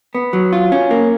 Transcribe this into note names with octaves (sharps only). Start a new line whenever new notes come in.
B3
F#3
F4
C#4
A#3